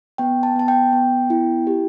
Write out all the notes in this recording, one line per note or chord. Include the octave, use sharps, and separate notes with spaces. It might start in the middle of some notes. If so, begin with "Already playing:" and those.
B3 G5
A5
B3 A5
G5
B3
E4
G4